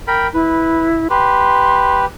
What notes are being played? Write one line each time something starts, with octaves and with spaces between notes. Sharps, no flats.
A#4 G5 B5
E4 B4
G4 B4 C6